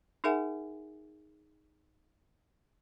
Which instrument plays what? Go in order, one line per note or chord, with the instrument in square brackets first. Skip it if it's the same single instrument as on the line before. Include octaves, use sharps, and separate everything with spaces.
[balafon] D#4 G#4 A#4 E5 F#5 G#5